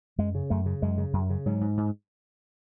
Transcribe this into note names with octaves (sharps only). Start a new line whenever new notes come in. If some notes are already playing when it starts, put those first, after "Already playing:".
F#2 G#3
C#3
F#2 A3
C#3
F#2 G#3
C#3
F#2
C#3
G#2 F#3
G#2
G#2